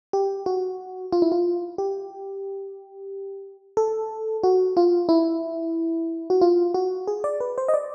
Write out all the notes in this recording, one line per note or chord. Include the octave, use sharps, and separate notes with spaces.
G4
F#4
F4
E4
F4
G4
A4
F#4
F4
E4
F#4
F4
F#4
G#4
D5
B4
C5
D#5
D5